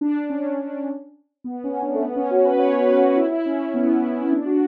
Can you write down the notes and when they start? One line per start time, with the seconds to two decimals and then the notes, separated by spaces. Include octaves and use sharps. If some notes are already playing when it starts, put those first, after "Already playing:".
0.01 D4
0.30 C#4
0.59 D4
1.44 B3
1.64 C#4
1.82 D4
1.94 A3
2.02 B3
2.16 C#4
2.31 F#4
2.45 B4
2.59 C#5
2.78 B4
2.98 F#4
3.17 E4
3.31 E4
3.46 C#4
3.74 B3
4.22 E4
4.32 D4
4.46 F#4